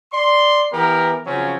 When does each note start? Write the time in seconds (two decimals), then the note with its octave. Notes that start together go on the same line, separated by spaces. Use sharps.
0.13 D5 C6
0.73 E3 B3 G4 A#4
1.26 C#3 F3 F#3 C4 C#4